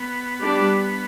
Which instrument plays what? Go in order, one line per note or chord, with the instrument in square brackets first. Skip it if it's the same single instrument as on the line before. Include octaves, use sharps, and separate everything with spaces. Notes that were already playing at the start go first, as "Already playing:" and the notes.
Already playing: [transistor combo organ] B3
[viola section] G3 D4 G4 D5